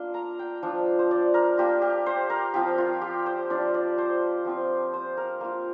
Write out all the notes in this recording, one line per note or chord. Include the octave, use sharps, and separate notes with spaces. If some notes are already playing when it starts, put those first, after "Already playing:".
Already playing: A#3 D4 F4 C6
A#5
G5
F3 D4 F4
C5
D5
A#4
A#3 D4 F4 G4
G4
C5
A#4
F3 C4 F4 G4
F4
G4
C5
F3 D4 F4 D5
D5
C5
F3 C4 F4
C5
A#4
A#3 F4